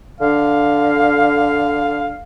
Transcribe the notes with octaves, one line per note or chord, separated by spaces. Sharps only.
D3 F5